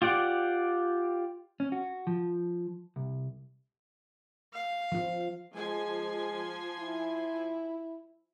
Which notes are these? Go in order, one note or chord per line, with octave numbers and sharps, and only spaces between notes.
F4 G4 D5 F#5
C#4
F#4
F3
C2
F5
F3 F4
F3 G#3 G#5 C6
E4